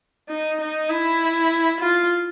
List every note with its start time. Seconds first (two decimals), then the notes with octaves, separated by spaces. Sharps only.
0.29 D#4
0.60 D#4
0.90 E4
1.80 F4